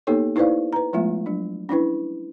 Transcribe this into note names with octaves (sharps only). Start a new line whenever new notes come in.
A#3 B3 D#4 G4 A4 C#5
D#4 E4 B4 C5 D5 F5
B4 A#5
F3 G#3 A3 B3 F4 E5
F#3 D4
C#4 D4 E4 B4